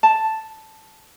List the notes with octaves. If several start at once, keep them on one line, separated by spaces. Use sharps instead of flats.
A5